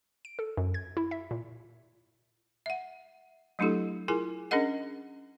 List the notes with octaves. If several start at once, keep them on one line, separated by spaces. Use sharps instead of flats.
D7
A4
F#2
G#6
E4
E5
A#2
E5 F#5
F#3 A3 D4 E4 G4 A4
E4 F4 G#4 A#4 G#5
C#4 D4 G#4 A#4 D#5 F#5